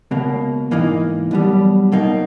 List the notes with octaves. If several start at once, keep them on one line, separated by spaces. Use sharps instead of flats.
C#2 B2 A#3
G#2 E3 A#3 D#4
B1 B2 G3
B1 B2 A#3 D#4